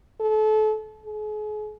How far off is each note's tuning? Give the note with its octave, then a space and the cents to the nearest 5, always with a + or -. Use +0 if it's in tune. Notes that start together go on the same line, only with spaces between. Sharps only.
A4 -30
G#4 +40